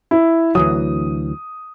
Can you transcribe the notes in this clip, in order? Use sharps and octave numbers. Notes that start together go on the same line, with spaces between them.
E4
D2 E3 F#3 D#6